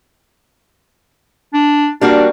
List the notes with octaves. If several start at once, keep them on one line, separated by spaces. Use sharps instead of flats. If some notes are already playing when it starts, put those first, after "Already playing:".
D4
G3 A#3 D4 F#4